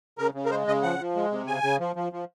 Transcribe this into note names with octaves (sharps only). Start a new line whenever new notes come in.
C#3 A#4
C#3
A#4
G#3 C5
C#3 D#5
F3 F#5
F3
G#3
C3
C#3 G#5
C#3
F3
F3
F3